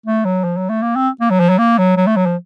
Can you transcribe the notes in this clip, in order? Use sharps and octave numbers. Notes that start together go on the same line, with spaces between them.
A3
F#3
F3
F#3
A3
A#3
C4
A#3
F#3
F3
F#3
A#3
F#3
F#3
A3
F#3
F3